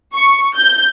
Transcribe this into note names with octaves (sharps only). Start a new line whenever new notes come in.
C#6
G6